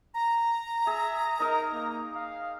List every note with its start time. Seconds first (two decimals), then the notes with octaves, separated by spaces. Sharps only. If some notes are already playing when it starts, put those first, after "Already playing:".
0.14 A#5
0.87 G#4 E5
1.40 D#4 A#4 D#5
1.73 A#3
2.16 F5